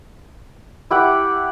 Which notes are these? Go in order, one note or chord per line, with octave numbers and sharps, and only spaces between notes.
E4 G4 F#5 D6